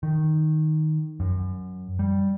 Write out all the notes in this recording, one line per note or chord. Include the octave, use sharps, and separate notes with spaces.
D#3
F#2
G3